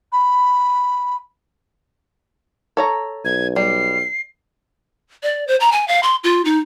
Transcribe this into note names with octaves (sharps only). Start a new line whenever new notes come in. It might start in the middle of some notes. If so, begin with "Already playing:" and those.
B5
A4 C#5 A#5
B1 G#6
G3 C7
D5
C5
A#5
G#5
F5
C6
F4
D#4